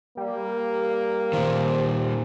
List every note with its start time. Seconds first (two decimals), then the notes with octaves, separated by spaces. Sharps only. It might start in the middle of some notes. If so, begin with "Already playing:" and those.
0.17 G3 A#3
1.33 A#2 D#3 C5